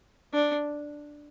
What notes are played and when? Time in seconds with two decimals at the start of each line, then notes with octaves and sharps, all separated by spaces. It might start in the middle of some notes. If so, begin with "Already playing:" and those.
0.33 D4